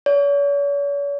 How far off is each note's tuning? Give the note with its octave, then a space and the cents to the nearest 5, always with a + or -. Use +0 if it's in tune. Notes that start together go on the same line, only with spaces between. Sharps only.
C#5 +40